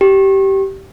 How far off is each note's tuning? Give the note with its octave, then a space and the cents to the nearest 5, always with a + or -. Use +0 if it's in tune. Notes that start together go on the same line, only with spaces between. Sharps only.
G4 -15